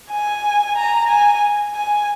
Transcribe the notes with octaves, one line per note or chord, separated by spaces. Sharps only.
G#5
A#5
G#5
G#5